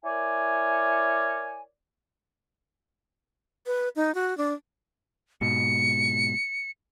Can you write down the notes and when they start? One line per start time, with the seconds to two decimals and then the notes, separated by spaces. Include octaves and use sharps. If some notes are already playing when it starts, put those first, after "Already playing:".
0.04 E4 A#4 C#5 D5 G#5
3.66 B4
3.96 D#4
4.15 F#4
4.37 D4
5.41 G#2 B2 C#7